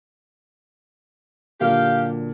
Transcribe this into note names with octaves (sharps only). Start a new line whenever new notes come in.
A#2 D3 F#3 G4 F5